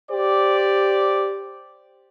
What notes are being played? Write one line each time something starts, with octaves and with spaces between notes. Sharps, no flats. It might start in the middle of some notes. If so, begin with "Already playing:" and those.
G4 C5 D5